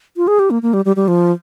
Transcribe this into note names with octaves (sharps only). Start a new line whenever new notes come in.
F4
G#4
G4
A#3
A#3
G3
G3
G3
F3